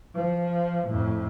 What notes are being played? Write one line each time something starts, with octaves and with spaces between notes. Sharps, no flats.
F3
F2 A2